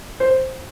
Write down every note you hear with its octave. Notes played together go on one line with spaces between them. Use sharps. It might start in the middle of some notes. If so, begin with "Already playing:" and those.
C5